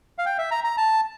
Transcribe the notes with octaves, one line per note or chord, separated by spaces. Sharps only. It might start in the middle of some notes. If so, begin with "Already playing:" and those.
F5
G5
E5
A#5
A#5
A5